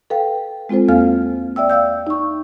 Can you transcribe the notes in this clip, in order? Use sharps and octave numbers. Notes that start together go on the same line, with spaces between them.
A4 B4 F5 G5
G#3 C4 F4 A4 C5
E2 A#3 C4 A4 F5 F6
D5 E5 G5 E6
D5 F5 E6 G6
D#4 C#6